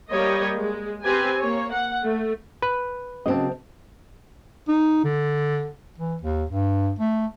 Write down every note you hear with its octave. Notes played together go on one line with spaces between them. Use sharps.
G3 A#3 G4 C#5 D#5
G#3
C4 G4 B4 G#5
A#3 C#5
F#5
A3
B4
C#3 F#3 A#3 C4 D#5 A5
D#4
D3
E3
D#2
G2
A3